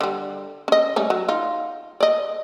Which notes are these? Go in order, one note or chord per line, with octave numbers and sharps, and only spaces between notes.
D3 G3
C#4 D#5
G3 A3 C#4
F#3
D#4 F4
D5 D#5